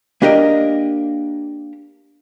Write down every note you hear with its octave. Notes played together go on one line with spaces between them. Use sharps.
A#3 D4 G4 A#4 D#5